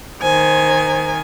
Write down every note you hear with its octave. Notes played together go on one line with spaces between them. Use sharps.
D#3 C5 G#5